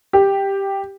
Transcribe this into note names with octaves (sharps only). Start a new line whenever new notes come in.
G4